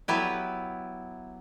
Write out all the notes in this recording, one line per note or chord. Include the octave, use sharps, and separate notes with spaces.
F#3 B3 E4 G4 B4